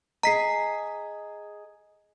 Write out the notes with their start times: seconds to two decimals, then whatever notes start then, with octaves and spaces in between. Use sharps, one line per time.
0.23 G#4 D#5 A#5 B6 C7